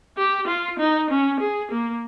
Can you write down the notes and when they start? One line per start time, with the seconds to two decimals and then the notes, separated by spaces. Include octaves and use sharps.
0.17 G4
0.47 F4
0.79 D#4
1.10 C#4
1.40 G#4
1.71 A#3